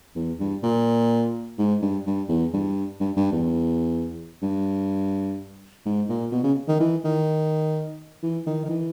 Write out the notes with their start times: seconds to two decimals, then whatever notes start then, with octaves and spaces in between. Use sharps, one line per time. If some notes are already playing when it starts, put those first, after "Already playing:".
0.16 E2
0.40 G2
0.63 A#2
1.58 G#2
1.82 G2
2.06 G2
2.29 E2
2.54 G2
3.00 G2
3.17 G2
3.32 E2
4.42 G2
5.86 G#2
6.09 A#2
6.32 B2
6.44 C#3
6.68 D#3
6.80 E3
7.04 D#3
8.23 E3
8.47 D#3
8.65 D#3
8.69 E3